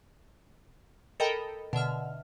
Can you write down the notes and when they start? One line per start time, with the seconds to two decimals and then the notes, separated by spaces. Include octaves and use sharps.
1.20 A4 A#4 D#5 G5 B5
1.73 B2 D3 E5 F6